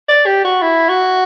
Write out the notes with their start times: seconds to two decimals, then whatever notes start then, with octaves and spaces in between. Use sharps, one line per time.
0.08 D5
0.26 G4
0.44 F#4
0.62 E4
0.89 F#4